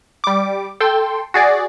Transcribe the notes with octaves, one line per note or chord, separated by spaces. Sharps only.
G3 D6
A4 G5 C6
F#4 G#4 D5